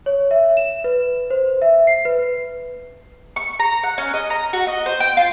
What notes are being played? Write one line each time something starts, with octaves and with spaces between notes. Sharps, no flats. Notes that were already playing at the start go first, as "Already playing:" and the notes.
C#5
E5
E7
B4
C5
E5
C7
B4
C#6
A#5
F#5
C#4
D#5
A#5
F#4
D#5
C5
G5
F4